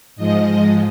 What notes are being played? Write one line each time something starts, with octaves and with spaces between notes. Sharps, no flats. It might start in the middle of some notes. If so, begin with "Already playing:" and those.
G#2 F3 G#3 D#5